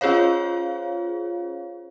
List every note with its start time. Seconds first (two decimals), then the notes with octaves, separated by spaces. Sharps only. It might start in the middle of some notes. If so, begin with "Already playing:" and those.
0.01 C#4 F4 G#4 C5 C#5 F5